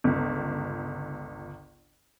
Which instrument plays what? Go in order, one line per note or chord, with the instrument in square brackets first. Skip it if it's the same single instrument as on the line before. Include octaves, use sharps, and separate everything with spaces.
[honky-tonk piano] G1 C#2